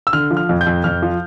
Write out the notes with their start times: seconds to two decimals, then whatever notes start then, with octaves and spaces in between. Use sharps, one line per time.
0.07 E6
0.13 D3 F6
0.31 F3
0.37 F6
0.49 F2
0.61 G6
0.66 F2
0.84 F2 F6
1.02 F3